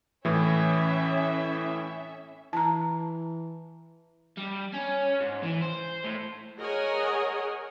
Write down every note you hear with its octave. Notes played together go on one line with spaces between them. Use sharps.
A2 E3 C#4 E5
E3 A5 A#5
G3
C#4
G#2
E3
C5
A2
G#4 A#4 C#5 D#5 F#5 G#5